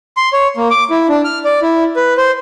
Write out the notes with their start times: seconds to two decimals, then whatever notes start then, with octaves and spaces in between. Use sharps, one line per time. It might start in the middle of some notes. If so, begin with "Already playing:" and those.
0.17 C6
0.33 C#5
0.57 A#3
0.71 D6
0.90 E4
1.09 D4
1.24 F6
1.45 D5
1.62 E4
1.96 B4
2.17 C5